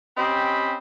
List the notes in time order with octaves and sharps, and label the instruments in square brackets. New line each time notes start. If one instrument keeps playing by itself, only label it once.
[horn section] C4 C#4 G4 D#5 G5 B5